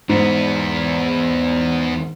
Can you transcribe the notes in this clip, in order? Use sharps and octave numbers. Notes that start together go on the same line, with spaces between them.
E2 G#2 B3